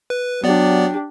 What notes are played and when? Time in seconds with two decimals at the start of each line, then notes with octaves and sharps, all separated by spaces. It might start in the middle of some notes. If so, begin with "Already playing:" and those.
0.10 B4
0.44 F#3 B3 D4 G4 D5